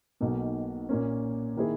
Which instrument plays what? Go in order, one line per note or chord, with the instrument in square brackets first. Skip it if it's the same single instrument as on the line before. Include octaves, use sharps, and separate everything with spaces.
[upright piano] B1 B2 A#3 D#4
A#2 A#3 C#4
D#3 A#3 E4 G#4